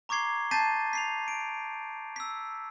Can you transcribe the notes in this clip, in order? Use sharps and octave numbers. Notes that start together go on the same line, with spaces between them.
A#5 C#6 D6 G#6 C7 G7
A5 G6 A6 B6 C7 D#7
B6 C7 F7
D7
E6 B6